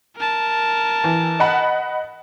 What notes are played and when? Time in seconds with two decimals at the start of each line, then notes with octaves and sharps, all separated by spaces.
0.17 A#4 A5
1.04 E3
1.40 D#5 F#5 B5